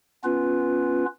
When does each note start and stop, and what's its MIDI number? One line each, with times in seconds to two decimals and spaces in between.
0.24 1.05 59
0.24 1.05 61
0.24 1.05 65
0.24 1.05 71